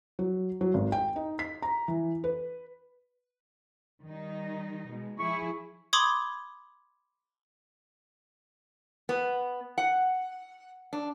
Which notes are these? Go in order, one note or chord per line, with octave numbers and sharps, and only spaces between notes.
F#3
F#3
G#1
G5
D#4
B6
A#5
E3
B4
D#3 G3 D#4
B2 G#3
F3 E4 G#4 C#6
B5 C6 D6 D#6 G#6
B3
F#5
D4